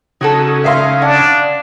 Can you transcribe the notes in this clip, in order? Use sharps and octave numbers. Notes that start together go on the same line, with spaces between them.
C#3 F#3 D#4 F#4 A4
E5 F5 C6
D4 F#5